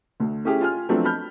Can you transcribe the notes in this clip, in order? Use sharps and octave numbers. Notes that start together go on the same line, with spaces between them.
D2 A3
A3 C#4 E4 G4 G#4
F4 G#5 F6
F3 F#3 A3 B3 C4 D4
A5 B5 F6 G6